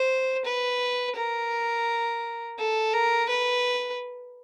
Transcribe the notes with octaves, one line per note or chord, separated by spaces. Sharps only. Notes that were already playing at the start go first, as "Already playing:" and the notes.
Already playing: C5
B4
A#4
A4
A#4
B4